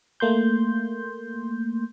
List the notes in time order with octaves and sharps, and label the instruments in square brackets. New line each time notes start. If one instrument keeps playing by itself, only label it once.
[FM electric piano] A3 A#3 C6 G6